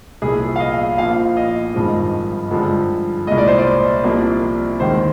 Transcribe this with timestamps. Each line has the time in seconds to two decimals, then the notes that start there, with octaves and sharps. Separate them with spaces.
0.22 C2 A#2 F3 G#4
0.56 F5
0.60 D#5
0.98 A#1 A#2 F3 F5
1.37 D#5
1.74 G#1 G2 F3 G#3
2.51 G2 D3 F3 G#3
3.27 C2 A#2 G#3 D#5
3.38 D5
3.48 C5
3.58 D5
4.04 C2 C3 F3 A#3
4.80 D#2 D#3 G#3 C5